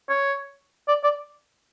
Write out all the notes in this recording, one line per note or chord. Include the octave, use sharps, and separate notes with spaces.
C#5
D5
D5